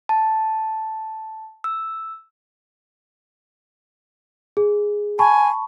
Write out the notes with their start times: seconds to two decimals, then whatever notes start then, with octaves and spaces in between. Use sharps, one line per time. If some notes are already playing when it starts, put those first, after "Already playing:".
0.09 A5
1.64 E6
4.57 G#4
5.19 G#5 A5 B5 C#6